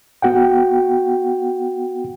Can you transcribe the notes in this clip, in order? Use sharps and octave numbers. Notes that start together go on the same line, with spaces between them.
B3 F#4 F#5 G5